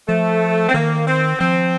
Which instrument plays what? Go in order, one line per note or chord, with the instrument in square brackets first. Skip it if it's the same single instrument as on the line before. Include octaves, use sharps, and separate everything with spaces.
[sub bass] F3 [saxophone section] A3
[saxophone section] C4
[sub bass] D#3 [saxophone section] A#3
[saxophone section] C4
[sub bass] F3 [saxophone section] C4